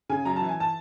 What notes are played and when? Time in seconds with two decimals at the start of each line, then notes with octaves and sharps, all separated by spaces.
0.09 C#3 G#5
0.25 F#2 A#5
0.36 E3 A5
0.49 G#5
0.60 A5